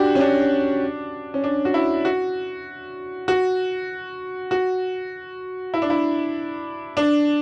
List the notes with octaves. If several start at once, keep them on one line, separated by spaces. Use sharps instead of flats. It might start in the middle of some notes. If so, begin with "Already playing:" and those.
Already playing: D4 F#4 G4
C#4
D4
C#4
D4
F#4
E4
F#4
F#4
F#4
E4
D4
E4
D4